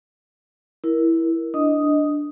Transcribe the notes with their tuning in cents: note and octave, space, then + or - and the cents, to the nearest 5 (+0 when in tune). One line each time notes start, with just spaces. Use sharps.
E4 +0 A#4 +15
D4 +0 D#5 +5 D#6 +0